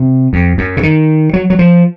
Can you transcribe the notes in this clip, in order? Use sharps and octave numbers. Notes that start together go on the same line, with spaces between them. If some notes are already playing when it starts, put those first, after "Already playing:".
Already playing: C3
F2
F#2
C#3
D#3
F#3
F#3
F3